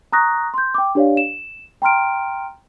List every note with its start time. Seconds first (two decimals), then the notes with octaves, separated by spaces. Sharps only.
0.13 A#5 C#6 D#6 F#6 A#6
0.54 C6 G6
0.74 G5 D6
0.95 D4 G4 C#5 D5 F5
1.17 E7
1.82 G5 A#5 C6 F6 D7